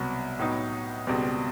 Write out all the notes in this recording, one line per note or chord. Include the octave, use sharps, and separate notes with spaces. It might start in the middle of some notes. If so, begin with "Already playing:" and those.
Already playing: C2 B2 F#3
A2 F#3 B3 D#4
C#2 B2 G3 C4